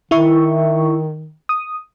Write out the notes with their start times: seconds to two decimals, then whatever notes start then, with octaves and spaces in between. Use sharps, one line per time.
0.11 D#3 E4 E5 C#6
1.49 D#6